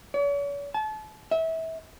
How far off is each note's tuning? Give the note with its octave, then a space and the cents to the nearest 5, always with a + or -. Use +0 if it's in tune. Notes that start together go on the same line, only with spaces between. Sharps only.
C#5 +45
A5 -35
E5 -25